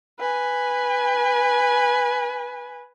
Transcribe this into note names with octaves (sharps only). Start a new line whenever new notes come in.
B4 G#5